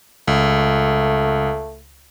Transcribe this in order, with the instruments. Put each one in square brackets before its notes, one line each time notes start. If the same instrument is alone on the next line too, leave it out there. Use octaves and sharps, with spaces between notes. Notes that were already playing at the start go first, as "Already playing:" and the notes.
[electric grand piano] C#2 [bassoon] A3